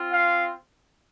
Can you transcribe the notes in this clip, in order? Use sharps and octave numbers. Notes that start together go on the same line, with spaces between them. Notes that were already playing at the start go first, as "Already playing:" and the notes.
Already playing: C4 F4
F5